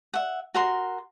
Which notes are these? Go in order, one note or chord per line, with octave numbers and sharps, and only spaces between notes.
E5 F#5
F#4 A#4 C6